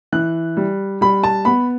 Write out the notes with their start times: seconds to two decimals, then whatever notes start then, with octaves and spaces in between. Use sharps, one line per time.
0.13 E3 F#6
0.57 G3
1.01 G3 B5
1.23 A5
1.45 B3 B5